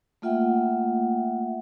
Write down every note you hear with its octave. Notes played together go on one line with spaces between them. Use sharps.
A3 A#3 F4 E5 F#5 G5